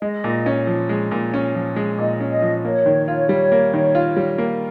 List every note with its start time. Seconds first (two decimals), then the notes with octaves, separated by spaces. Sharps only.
0.02 G#3 D#5
0.24 A#2
0.46 C#4
0.67 F3
0.89 G#3
1.11 A#2
1.34 C#4
1.55 F3
1.76 G#3
1.98 A#2 D#5
2.21 C#4
2.31 D#5
2.42 F3
2.64 A#3 C#5
2.86 D#3
3.08 F4
3.29 G3
3.52 A#3
3.73 D#3
3.95 F4
4.16 G3
4.38 A#3